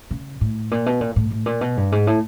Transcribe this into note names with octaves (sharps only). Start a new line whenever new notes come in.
C#3
A2
A#2
B2
A#2
A2
A2
A#2
B2
G2
G#2
A2